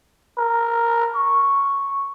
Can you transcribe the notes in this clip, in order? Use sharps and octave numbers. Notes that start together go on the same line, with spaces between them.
A#4
C#6